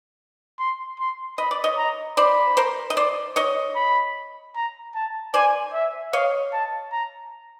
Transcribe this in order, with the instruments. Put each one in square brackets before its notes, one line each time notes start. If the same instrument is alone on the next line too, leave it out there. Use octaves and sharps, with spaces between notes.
[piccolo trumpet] C6
C6
[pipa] D#5 [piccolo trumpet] B5
[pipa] D5
C#5 D#5
[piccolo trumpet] A#5
[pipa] C5 D5 [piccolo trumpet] B5
[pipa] A#4 C5
D#5
C5 D5
C#5 D#5
[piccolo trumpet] B5
A#5
A5
[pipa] C5 D5 [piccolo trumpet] G#5
[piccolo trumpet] E5
[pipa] C#5 D#5 [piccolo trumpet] F5
[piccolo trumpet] A5
A#5